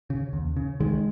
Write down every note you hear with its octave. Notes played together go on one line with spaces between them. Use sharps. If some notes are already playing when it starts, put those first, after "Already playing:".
C#3
D#2
C#3
C#2 D#3 G#3